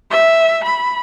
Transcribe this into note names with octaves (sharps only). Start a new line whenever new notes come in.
E5
B5